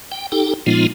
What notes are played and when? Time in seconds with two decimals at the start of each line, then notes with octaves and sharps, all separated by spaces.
0.12 G5
0.32 D#4 G4 A4 G5
0.66 A#2 F3 G#3 B3 D#4 F4